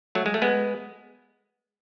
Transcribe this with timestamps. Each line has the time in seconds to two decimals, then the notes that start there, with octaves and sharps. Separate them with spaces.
0.15 F#3 A3
0.26 G#3
0.34 A3
0.42 G#3 B3